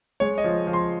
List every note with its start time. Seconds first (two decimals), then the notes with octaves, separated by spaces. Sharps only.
0.20 G#3 C#5
0.38 D#5
0.44 F3
0.67 F3
0.73 C6